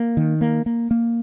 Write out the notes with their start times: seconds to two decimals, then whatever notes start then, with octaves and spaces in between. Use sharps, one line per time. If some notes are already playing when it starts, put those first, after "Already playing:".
Already playing: A#3
0.17 D#3
0.41 A#3
0.66 A#3
0.91 A#3